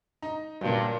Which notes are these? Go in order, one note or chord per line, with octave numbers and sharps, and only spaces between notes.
D#4
G2 A#2 F#3